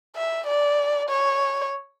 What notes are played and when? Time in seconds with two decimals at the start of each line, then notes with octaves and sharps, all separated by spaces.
0.16 E5
0.47 D5
1.09 C#5